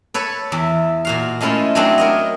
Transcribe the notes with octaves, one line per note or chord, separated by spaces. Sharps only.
A4 B4 C#5
E2 E5
A#2 F#4 F5
G#3 A3 C#4 E4 F4
F#3 G#3 A3 C4 D4 F#4
A#4 C#5 D#5